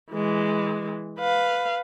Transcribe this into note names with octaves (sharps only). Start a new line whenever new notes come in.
E3 G#3
B4 F5